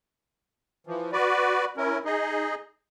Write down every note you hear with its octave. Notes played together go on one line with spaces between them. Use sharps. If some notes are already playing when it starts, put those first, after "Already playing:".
E3 F3
F#4 B4 D5
C#4 E4 A#4
D#4 G#4 D#5